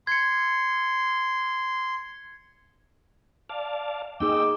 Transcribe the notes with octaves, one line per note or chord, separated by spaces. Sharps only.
C6 G#6 C#7
D5 F5 A5
A#3 D#4 G#4 D#5 G5 D6 E6